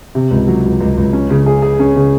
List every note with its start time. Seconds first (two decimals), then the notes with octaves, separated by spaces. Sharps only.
0.15 C3
0.31 C#2
0.48 F#3
0.64 C#2
0.80 C#2
0.97 C#2
1.13 C#4
1.30 C#3
1.46 G#4
1.62 G#4
1.79 C#4
1.96 C#3